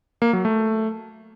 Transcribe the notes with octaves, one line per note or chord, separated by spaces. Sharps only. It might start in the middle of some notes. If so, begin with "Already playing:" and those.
A#3
F#3
A3